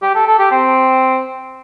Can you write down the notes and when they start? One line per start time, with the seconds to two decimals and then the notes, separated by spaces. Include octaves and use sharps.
0.02 G4
0.15 A4
0.27 A4
0.39 G4
0.51 C4